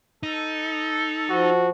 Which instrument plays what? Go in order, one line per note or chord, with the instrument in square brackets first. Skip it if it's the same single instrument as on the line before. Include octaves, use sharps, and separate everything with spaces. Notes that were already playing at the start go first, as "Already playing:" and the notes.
[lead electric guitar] D#4 [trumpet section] A4
[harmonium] F3 [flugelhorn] F#4